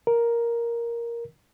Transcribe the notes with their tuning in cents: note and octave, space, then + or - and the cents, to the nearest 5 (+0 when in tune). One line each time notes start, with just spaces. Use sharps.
A#4 +5